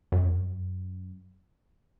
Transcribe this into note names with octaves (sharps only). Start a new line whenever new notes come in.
F#2
F2
F#2